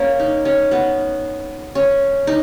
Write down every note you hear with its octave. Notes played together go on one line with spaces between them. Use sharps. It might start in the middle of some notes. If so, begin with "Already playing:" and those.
Already playing: A#3 C#4
D#4
C#4
B3
C#4
D#4